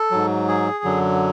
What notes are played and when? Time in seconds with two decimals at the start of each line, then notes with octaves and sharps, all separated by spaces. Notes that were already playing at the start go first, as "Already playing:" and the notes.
Already playing: A4
0.11 G#2 F#3
0.48 G#4
0.84 F#2 D3 F#3